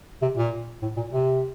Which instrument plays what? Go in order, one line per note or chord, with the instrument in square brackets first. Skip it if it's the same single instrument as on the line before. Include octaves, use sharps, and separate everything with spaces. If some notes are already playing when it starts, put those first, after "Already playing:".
[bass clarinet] C3
A#2
A2
A#2
C3